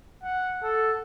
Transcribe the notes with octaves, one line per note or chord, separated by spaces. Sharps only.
F#5
A4